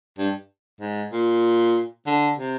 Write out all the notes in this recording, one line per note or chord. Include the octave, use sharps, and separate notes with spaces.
G2
G#2
A#2
D3
C3